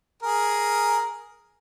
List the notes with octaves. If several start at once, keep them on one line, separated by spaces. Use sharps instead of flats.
G#4 A#4